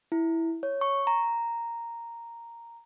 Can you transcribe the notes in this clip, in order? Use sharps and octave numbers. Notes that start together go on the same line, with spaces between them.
E4
C#5
C#6
A#5